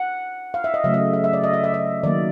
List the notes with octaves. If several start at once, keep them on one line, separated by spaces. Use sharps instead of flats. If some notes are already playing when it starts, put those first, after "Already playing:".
Already playing: F#5
F5
E5
D#5
C#3 F#3 A3 E5
D#5
E5
E5
D5
D#5
E5
E5
D#5
D#3 F#3 A#3 D5